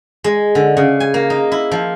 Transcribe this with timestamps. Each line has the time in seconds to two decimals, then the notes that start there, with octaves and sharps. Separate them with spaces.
0.24 G#3
0.55 D3
0.77 C#3
1.00 G#5
1.14 A#3
1.30 D#4
1.52 E4
1.71 F3